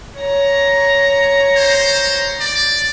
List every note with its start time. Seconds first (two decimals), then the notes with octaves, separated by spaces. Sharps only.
0.19 C#5 A#5
1.56 C5
2.40 D5